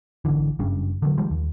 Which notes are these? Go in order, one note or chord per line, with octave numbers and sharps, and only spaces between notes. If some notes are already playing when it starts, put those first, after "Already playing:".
G#1 C#2 D3 E3
F#1 G2 C#3
D3 D#3 F#3
D#3 F3 G3 G#3
D#2